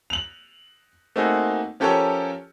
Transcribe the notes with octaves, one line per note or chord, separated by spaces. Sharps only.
F7 F#7
A3 A#3 C4 D#4 F#4 G#4
F3 C#4 G4 A4 A#4 C#5